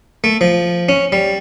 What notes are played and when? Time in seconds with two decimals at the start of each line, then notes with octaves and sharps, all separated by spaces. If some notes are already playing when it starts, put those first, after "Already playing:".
0.24 A3
0.41 F3
0.89 C#4
1.12 G3